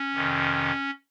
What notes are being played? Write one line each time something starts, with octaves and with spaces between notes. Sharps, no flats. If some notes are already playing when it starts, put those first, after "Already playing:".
Already playing: C#4
F2 C3 D#3